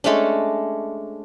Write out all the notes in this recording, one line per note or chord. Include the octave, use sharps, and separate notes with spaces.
G#3 A3 C#4 D4